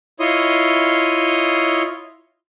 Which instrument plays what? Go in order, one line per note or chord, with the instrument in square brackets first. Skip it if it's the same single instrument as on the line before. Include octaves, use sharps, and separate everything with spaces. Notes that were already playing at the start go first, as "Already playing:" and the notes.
[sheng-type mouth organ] E4 F4 C#5 D#5 C6 D#6